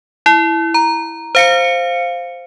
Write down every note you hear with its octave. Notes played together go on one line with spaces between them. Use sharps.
E4
A#5
C5 F5 C#7